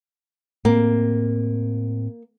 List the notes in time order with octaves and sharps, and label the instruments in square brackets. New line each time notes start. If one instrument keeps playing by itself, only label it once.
[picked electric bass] A2 C4 [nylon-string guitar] A#3